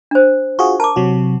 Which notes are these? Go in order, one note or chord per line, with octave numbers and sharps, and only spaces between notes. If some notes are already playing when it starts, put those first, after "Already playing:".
D4 C5
F4 F#4 G#4 C#6
A#4 A5 D6
C3 F#3 F#4